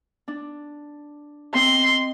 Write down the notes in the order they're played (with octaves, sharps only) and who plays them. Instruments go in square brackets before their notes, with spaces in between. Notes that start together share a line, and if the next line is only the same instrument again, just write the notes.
[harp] D4
[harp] C4 D#5 [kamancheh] C6